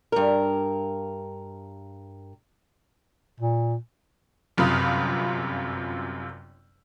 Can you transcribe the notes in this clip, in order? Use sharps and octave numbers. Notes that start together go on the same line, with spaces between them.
G2 A#4
A#2
G1 F#2 C3 F4 B5 D#6